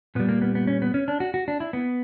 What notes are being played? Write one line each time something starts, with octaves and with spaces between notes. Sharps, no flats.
A#2 G3 B3
A#3
B3
B3
C#4
B3
C#4
D4
F#4
F#4
D4
E4
B3